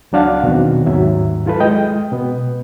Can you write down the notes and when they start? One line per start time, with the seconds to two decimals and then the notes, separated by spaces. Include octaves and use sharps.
0.12 C#2 F#3 D4 F5 F#5
0.43 E2 B2 D#3 F#3 C4 F#4
0.86 D#2 G#2 F#3 E5
1.46 E4 F4 A4 B4
1.60 G#3 D#5 G5
2.12 B2 B3